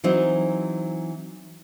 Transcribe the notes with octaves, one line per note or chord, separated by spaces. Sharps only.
E3 F#3 C4 D#4